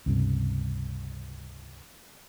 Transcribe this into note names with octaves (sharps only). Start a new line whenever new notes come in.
C#2 G2 C3